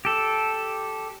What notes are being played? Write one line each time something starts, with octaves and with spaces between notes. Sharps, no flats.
G4 A4